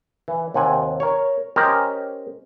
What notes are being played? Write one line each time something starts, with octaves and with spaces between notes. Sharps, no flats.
E3
D#2 C3 F#5 G#5
A#4 C#5
C#4 G4 A#4 C5 D#5